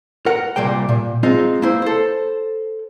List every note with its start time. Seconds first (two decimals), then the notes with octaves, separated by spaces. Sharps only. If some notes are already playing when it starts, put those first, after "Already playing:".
0.26 A#4 F#5
0.56 C2 A#2 G3 A#3 G5
0.89 A#2
1.23 G#3 C4 D#4 F4
1.62 A#3 E4 C5
1.82 A4 C5